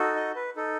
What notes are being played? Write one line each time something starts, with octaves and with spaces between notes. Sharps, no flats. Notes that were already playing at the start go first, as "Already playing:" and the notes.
Already playing: D#4 F#4 A4
D#5
B4
D#4 A4